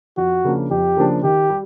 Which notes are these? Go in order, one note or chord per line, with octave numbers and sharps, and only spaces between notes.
F2 F#4
C#3 F3 A#3 D4
F2 G4
C#3 F3 A#3 D4
D#3 G4
G3